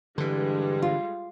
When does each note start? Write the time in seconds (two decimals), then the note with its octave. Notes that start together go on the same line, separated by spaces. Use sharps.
0.18 G2 D3 E3 G3 G#3
0.82 F4